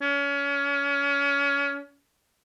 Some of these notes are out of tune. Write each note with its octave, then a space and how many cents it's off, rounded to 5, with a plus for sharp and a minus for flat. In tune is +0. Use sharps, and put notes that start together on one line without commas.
C#4 +30